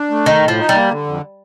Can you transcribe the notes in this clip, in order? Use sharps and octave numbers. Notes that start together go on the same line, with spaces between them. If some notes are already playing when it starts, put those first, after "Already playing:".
Already playing: D4
A3
D#3 D#4
A2
F3
D#4
G3
A#3
D3
F2